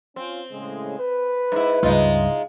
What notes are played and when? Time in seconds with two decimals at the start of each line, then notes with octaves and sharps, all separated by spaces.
0.16 C4 C#4 F4
0.51 A2 C#3 G#3
0.99 B4
1.52 G#2 E4
1.83 C#2 G2 G#3 D#4 F4